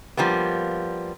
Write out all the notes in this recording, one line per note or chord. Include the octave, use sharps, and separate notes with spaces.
F3 G3 A#3 B3